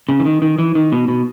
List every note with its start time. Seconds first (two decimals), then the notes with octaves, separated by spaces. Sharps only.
0.09 C#3
0.20 E3
0.25 D#3
0.42 D#3
0.59 E3
0.75 D#3
0.92 B2
1.08 B2